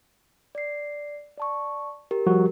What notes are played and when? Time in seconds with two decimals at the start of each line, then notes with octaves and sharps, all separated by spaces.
0.55 D5 C7
1.37 D5 A5 C#6
2.11 G4 A#4
2.27 F3 G3 F#4